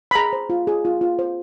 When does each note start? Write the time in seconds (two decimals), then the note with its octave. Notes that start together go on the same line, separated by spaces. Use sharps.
0.11 B5
0.15 G#4 A#5
0.33 C5
0.50 F4
0.67 G#4
0.85 F4
1.01 F4
1.19 C5